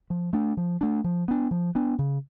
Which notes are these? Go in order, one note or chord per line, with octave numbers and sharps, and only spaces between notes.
F3
A3 D4
F3
A3 D4
F3
B3 D4
F3
B3 D4
C#3